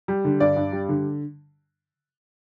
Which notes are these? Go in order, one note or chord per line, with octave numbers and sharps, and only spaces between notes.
G3
D3
G2 D5
G2
G3
D3